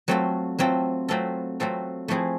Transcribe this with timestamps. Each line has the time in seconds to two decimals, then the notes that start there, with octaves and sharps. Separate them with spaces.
0.08 F#3 A3 C4 F4 A4
0.59 F#3 A3 C4 F4 A4
1.09 F#3 A3 C4 F4 A4
1.60 F#3 A3 C4 F4 A4
2.08 F3 A3 C4 E4 G#4